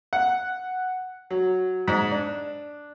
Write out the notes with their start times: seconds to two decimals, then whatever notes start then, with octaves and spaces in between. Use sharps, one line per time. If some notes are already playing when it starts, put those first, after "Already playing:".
0.13 F#5
1.31 F#3
1.88 G#2
2.11 D4